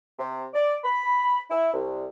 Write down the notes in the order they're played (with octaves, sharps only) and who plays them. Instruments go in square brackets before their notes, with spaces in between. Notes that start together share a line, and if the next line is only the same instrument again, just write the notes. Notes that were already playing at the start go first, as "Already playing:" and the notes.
[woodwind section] C3
D5
B5
E4
C2